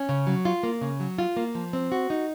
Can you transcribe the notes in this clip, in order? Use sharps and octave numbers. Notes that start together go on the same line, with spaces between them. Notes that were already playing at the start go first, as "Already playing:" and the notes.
Already playing: C#4
C#3
F#3
F4
A#3
C#3
F#3
F4
A#3
F3
C4
F#4
D#4